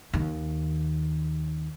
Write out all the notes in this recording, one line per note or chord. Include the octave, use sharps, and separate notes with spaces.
D#2 D#3